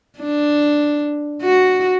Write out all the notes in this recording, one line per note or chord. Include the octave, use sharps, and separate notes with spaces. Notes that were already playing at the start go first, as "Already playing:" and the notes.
D4
F#4